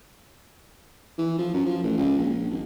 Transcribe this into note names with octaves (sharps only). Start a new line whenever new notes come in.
E3
F3
F#2
F3
A1
C#2
A#1
A#1
G#1